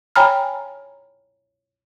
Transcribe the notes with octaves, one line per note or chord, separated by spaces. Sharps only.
C#5 G5 G#5 A#5 B5 F6